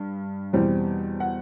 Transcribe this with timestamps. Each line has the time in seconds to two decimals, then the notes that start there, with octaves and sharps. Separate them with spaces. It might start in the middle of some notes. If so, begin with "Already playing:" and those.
Already playing: G2
0.53 E2 B2 G3 C4
1.20 F#5